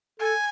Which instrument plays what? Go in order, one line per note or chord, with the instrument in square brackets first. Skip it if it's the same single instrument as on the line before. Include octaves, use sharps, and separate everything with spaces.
[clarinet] A4 [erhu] G#5